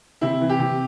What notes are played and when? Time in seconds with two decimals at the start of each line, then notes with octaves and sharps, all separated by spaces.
0.21 C3 E4
0.41 E3
0.49 G4
0.59 C3